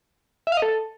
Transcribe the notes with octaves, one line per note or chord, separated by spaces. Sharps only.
E5
F5
D#5
A4